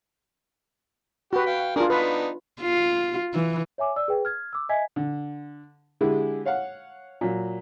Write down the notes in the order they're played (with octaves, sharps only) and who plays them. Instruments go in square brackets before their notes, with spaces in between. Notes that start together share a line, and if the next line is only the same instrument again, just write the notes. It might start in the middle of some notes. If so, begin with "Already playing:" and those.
[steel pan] F#4 B4 [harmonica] G4
[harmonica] F5 G5
[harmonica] A#3 G#4 A#4 [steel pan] D4 F4
[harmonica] B3 D4 D#4 [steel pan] B4
[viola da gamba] F4
E3
[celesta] C#5 E5 G#5 D6
D5 E6
G#4 B4 G5
F6 G#6
D6 E6
D#5 E5 G#5 G#6 B6
[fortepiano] D3
D3 G#3 E4 G4 G#4
C#5 F5 F#5
A#2 F#3